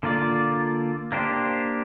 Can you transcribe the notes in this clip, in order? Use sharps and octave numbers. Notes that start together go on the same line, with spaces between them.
D3 A#3 F4 D5
A#3 D4 G4 C5